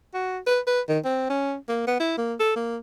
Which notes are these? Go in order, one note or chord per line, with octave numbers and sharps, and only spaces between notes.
F#4
B4
B4
D#3
C4
C#4
A#3
B3
E4
A#3
A4
A#3